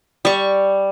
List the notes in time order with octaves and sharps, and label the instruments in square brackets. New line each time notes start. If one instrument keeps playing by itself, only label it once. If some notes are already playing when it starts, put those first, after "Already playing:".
[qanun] G3 C#6